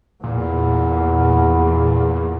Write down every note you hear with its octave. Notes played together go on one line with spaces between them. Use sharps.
E2 A#2